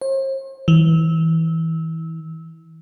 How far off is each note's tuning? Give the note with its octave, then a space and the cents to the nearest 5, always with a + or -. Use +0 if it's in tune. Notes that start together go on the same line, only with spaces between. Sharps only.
C5 +45
E3 -25